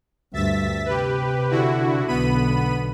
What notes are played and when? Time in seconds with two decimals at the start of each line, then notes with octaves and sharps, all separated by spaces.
0.33 D2 G2 E5 A6 B6
0.85 C3 G4 B4
1.51 D3 E4 F#4
2.08 B1 D3 B3 B5 D#7